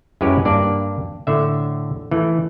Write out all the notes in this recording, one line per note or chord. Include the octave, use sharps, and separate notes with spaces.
F#2 G#3 E4 G4 B4 C#5
G2 A#3 D4 D5
A2 D3 E5
E3 A3